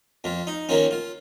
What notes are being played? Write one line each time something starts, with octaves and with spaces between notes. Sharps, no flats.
F2 F4
D#4
D#3 A#3 C#4 F4
F4